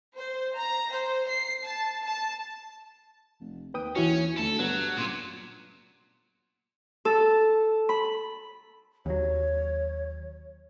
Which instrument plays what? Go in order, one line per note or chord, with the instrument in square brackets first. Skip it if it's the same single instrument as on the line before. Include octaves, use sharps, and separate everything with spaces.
[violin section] C5
A#5
C5
C7
A5
A5
[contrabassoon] F1
[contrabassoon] D#2 [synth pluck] B4 G5 D#6
[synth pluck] E3 E4 F#4 [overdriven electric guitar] C#4
[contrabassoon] D2 [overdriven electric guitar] A4
[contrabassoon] G2 [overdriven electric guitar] F#3 [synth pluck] B3
[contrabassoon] F#1 [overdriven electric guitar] A#2
[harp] A4
B5
[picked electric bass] D#2 F#3 [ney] C#5